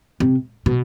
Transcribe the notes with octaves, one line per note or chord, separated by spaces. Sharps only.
C3
B2